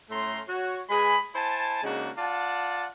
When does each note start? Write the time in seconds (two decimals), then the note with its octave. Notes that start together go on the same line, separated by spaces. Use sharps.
0.10 A2 A3 C#4 A#5 C6
0.48 F#4 C#5
0.90 G#3 G#4 B4 G#5 B5
1.35 E4 C5 G#5 A5
1.83 C#3 G#3 A#3 D4 D#4 F#4
2.18 F4 D5 F#5 A5